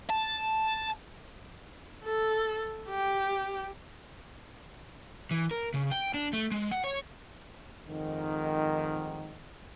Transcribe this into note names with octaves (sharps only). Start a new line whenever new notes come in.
A5
A4
G4
E3
A#4
C#3
G5
D4
A3
G#3
F#5
C#5
F2 G#2 D#3